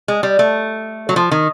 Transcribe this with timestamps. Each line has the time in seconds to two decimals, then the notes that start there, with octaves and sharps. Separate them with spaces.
0.08 G#3
0.23 G3
0.39 A3
1.09 F#3
1.16 F3
1.31 D#3